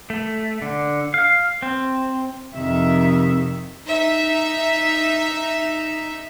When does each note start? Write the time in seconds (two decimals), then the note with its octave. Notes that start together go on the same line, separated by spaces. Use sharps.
0.10 A3
0.62 D3
1.14 F5
1.62 C4
2.55 F2 C3 D#3 E5
3.87 D#4 E5